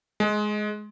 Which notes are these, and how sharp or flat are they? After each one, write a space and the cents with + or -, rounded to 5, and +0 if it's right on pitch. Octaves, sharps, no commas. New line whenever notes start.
G#3 +15